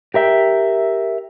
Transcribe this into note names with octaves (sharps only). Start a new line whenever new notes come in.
G4 A#4 E5 G5